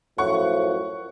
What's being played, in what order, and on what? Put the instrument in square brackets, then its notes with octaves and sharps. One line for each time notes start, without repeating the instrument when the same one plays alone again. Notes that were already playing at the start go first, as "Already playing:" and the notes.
[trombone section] F#2 A2 F3 [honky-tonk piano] F#5 C#6